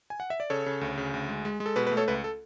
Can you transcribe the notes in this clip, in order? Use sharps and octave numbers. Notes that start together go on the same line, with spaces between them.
G#5
F#5
E5
D5
C#3 A4 C#5
C#3
D2
C#3
D2
G#3
G#3
G#3
A4
B2 B4
B4
A3
A4 C#5
C#2 B4
A4